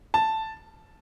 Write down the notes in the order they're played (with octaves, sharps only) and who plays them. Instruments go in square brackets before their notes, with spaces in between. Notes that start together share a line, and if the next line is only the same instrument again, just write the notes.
[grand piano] A5